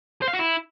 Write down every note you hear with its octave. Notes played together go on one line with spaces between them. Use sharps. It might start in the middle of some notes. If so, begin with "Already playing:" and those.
C5
F5
F#4
E4